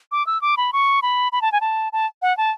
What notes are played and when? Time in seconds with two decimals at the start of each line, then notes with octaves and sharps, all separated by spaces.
0.12 D6
0.26 E6
0.42 D6
0.57 B5
0.73 C#6
1.02 B5
1.32 B5
1.42 A5
1.52 G#5
1.61 A5
1.93 A5
2.22 F#5
2.37 A5